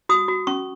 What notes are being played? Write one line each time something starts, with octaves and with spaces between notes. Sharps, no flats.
F#4 D#6
F#4
C#4 C#6